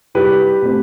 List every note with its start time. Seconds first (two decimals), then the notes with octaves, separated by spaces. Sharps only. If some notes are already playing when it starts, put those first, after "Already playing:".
0.15 C2 G4 B4
0.62 B2 A3 C4